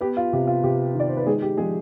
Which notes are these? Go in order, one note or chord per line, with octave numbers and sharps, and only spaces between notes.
B3 G4
F4
C3 G4
F4
C3 G4
D#3
D5
C5
B4
G#3 D#4 G#4
G4
F3 G#3 G#4